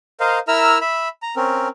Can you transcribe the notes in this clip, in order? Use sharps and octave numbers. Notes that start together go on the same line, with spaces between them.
A#4 C5 D#5 F5
E4 A#4 E5 A#5 E6 F6
E5 B5
A#5
C4 C#4 A#4